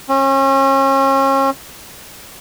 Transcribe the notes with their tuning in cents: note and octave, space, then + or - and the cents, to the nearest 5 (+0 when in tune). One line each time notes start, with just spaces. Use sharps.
C#4 -35